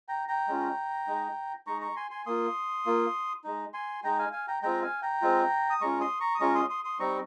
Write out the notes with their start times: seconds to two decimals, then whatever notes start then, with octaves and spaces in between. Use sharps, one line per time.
0.08 G5 A#5
0.28 G5 A#5
0.48 G#3 C#4 F4
1.07 G#3 D#4
1.67 G#3 D#4 A#5 C#6
1.81 A#5 C#6
1.96 G#5 C6
2.11 G#5 C6
2.26 A#3 F4 C6 D#6
2.86 A#3 F4
3.44 G#3 D#4
3.74 G#5 C6
4.04 G#3 D#4 G5 A#5
4.19 F5 G#5
4.33 F5 G#5
4.48 G5 A#5
4.62 G#3 C4 F4 G5 A#5
4.82 F5 G#5
5.02 G5 A#5
5.22 G#3 C4 F4
5.70 D#6
5.81 G#3 C#4 F4 A#5 C#6
6.01 C6 D#6
6.20 A#5 C#6
6.35 D#6
6.40 G#3 C#4 F4 A#5 C#6
6.55 C6 D#6
6.70 C6 D#6
6.84 C6 D#6
6.99 G3 C4 D#4 A#5 C#6